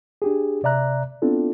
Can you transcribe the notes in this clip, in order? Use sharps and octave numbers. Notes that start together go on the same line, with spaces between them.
D4 G4 G#4
C3 D5 E5 A#5 F#6
B3 C4 D4 E4 F4 A4